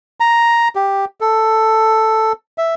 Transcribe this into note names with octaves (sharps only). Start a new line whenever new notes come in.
A#5
G4
A4
E5